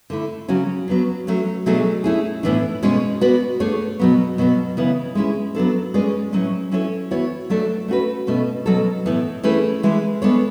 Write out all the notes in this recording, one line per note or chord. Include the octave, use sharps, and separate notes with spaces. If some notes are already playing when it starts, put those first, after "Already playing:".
D3 A3 E4
C#3 F#3 C#4 F#4
F#3 B3 D4
F#3 A3 C#4
B2 F#3 A3 D4 G#4
A3 C#4 E4 G#4
A2 E3 B3 D4
B2 G#3 C#4 G#4 C#5
B3 F#4 B4 D5
A3 D4 G#4 C#5
B2 F#3 B3
B2 F#3 B3
C#3 E3 B3
G#3 C#4 E4 G#4
F#3 B3 D4 A4
G#3 C#4 G#4 B4 D5
A2 F#3 C#4
F#3 C#4 E4 A4 C#5
E3 B3 F#4 C#5
F#3 A3 D4 A4 D5
A3 C#4 F#4 B4
B2 A3 C#4
B2 F#3 C#4 F#4 A4
A2 E3 B3
E3 A3 C#4 G#4 B4
E3 G#3 D4
G#3 B3 D4 A4 C#5